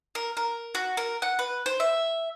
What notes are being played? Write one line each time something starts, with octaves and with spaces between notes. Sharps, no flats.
A#4
A#4
F#4
A#4
F#5
B4
C5
E5